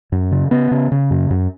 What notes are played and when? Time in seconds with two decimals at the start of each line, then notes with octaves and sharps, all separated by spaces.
0.12 F#2
0.32 C#3
0.51 C#3 B3
0.71 C#3
0.92 C#3
1.11 F#2
1.30 F#2